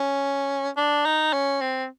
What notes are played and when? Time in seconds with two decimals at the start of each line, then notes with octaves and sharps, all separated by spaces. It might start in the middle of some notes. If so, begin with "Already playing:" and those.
Already playing: C#4
0.77 D4
1.05 D#4
1.33 C#4
1.61 C4